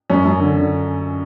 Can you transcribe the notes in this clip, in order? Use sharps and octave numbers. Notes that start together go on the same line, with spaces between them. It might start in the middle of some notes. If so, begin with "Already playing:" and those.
F#2 C#4
F#2
D3
D3